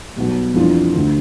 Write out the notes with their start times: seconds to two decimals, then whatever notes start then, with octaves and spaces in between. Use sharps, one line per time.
0.16 B1 B2 G3
0.54 F2 E3 G3 D4 F4
0.93 D2 D3 A3